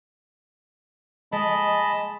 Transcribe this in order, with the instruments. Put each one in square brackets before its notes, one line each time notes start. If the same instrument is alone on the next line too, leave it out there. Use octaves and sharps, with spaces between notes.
[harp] G#3 [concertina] D#5 A5 B5